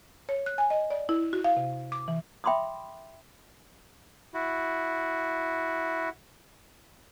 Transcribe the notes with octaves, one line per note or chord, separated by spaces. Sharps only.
C#5
F#6
G#5
D#5
D5
E4
F#4
F5
C3
D6
E3
E5 G5 B5 C6 D6 D#6
E4 F#4